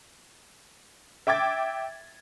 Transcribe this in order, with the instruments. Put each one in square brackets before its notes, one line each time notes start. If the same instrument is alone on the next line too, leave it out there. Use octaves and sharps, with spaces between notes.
[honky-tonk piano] E5 G5 D6 G#6 A6